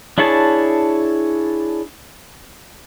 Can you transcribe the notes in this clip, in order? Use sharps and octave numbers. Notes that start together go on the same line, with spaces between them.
D4 E4 G#4 C#5 A5